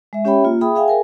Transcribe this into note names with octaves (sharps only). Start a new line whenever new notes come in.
G#3 E5
C#4 G4 C#5 E5 G5 B5
A#3 F4
G#4 E5 G5 B5 D#6
G#4 E5 F5 G5 G#5
G#4 A#4 G#5